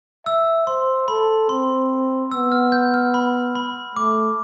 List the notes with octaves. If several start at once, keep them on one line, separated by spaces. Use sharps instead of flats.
E5 E6
C5 C6
A4 B5
C4 C6
B3 E6
F6
G6
F6
B5
B5
A3 D6